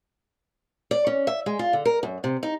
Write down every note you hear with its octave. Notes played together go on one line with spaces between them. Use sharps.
D5
C#4
E5
G#3
F4
D3
A#4
F#2
C3
D#4